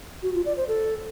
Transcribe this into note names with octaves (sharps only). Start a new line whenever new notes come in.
F#4
F4
D5
C5
A4